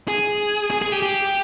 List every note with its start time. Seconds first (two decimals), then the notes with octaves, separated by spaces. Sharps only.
0.08 G#4
0.71 G#4
0.82 G#4
0.92 G4
1.02 G4